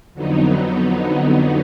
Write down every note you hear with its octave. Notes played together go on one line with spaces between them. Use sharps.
F2 D3 F#3 B3 D#4